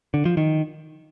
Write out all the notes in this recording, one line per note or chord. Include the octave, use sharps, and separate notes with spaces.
D3
F3
D#3